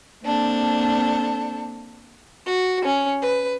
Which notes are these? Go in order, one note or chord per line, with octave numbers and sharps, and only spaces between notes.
A#3 C4 D4 A4
F#4
C#4
B4